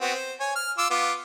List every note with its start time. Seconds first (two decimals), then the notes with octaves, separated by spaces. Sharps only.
0.01 B3 C4 F#4
0.15 C5
0.40 C#5 G#5
0.55 F6
0.78 F4 D6 E6
0.90 B3 F4 D6